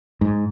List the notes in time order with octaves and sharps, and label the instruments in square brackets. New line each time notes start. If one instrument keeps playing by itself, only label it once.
[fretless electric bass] G#2